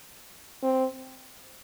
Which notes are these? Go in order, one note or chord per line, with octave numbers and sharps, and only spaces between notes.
C4